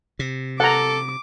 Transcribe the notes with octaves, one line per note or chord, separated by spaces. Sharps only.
C3
A4 F#5 A#5 D6